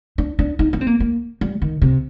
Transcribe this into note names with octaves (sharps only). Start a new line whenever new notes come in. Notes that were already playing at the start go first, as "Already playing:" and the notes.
D4
D4
D#4
D4
C4
A#3
A#3
G3
D#3
C3